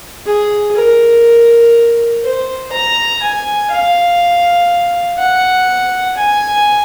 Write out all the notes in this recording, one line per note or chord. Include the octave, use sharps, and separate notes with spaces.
G#4
A#4
C5
A#5
G#5
F5
F#5
G#5